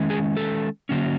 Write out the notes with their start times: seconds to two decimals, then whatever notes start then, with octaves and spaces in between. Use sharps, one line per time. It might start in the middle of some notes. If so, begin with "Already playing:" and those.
Already playing: D#3 G#3 C#4
0.10 G#4
0.37 A4
0.89 D3 F#3 A#3 C#4